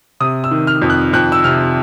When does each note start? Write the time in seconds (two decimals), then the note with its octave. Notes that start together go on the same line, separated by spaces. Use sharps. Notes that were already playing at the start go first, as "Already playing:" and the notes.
0.20 C3 D#6
0.44 E6
0.51 D#3
0.67 F6
0.82 F2
0.90 F#6
1.13 F2 F#6
1.32 E6
1.44 C3 F6